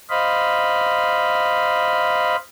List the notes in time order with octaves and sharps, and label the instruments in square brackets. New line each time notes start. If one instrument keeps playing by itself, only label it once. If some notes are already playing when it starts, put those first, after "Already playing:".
[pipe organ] C5 D#5 F5 B5